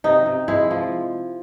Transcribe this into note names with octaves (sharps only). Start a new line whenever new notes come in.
C3 D#4
C3
G#3 E4
F3